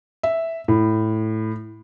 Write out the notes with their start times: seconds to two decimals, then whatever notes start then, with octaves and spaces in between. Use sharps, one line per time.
0.23 E5
0.68 A2